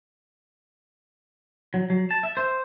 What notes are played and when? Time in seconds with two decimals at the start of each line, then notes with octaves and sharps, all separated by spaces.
1.74 F#3
1.90 F#3
2.11 A5
2.23 E5
2.37 C5